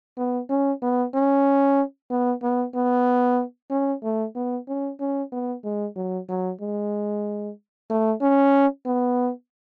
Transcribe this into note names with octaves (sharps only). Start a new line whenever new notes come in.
B3
C#4
B3
C#4
B3
B3
B3
C#4
A3
B3
C#4
C#4
B3
G#3
F#3
F#3
G#3
A3
C#4
B3